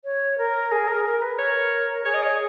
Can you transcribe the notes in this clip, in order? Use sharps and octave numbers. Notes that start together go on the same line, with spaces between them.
C#5
A#4
G#4
A#4
A#4
B4
A#4 C#5
G#4 C#5
D#5
C#5